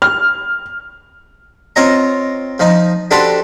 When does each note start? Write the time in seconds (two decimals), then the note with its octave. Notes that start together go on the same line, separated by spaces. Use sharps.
0.02 F6
1.76 C4 F4 C#5 D#5 A#5
2.59 F3 D#4
3.11 D4 F#4 G4 A4 B4 C5